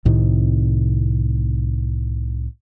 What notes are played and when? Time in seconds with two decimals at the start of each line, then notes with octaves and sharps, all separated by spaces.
0.05 C2 A2 C3 D#3